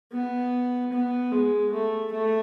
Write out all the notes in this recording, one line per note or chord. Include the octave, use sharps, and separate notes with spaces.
B3
B3
G#3
A3
A3